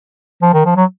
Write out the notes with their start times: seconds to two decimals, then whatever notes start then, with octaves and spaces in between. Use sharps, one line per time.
0.43 F3
0.54 D#3
0.65 F3
0.77 F#3